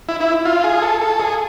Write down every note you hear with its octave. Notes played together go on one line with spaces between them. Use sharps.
E4
E4
F4
G#4
A4
A4
G#4